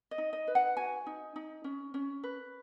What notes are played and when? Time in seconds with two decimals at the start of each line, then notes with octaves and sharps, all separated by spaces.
0.11 D#5
0.18 D#4
0.33 D#5
0.48 B4
0.55 F#5
0.77 F#4 G#5
1.07 D#4
1.36 D#4
1.64 C#4
1.94 C#4
2.24 B4